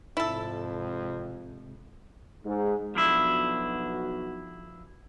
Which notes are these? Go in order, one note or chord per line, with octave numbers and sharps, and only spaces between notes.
F2 G#2 C3 E4 A4
G#2
B1 F3 B3 D4 E4 F#4